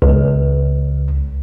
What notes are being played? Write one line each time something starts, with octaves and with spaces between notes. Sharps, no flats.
C#2